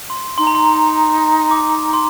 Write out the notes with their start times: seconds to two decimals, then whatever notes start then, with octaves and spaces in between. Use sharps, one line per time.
0.10 C6
0.38 D#4 C6
0.47 A#5
0.55 C6
0.67 A#5
1.51 D6
1.93 C6